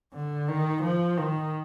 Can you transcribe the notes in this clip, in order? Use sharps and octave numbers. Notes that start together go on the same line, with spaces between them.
D3
D#3
F3
D#3